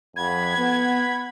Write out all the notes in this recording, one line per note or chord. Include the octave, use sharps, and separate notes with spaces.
F2 F#5 B5 G#6
B3